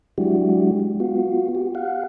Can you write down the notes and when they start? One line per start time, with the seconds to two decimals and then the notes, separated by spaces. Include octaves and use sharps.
0.18 F#3 G#3 D4 E4 F#4 G4
0.80 G#3
1.00 B3 F4 F#4
1.55 F#4 G4
1.75 G4 F5 F#5